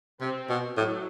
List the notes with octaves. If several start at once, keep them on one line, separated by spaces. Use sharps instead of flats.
C3 C4
B2
A2 F#3